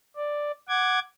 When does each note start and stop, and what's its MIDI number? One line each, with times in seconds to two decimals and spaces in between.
0.16 0.51 74
0.68 0.99 78
0.68 0.99 86
0.68 0.99 92